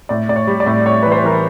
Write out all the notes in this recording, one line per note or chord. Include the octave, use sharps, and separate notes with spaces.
A2 D5
A2 D5
C#5
G3
D5
A2
A2 C#5
E3 B4
C5
E3 A#4